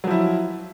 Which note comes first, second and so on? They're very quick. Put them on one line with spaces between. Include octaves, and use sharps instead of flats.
F#3 F3 E4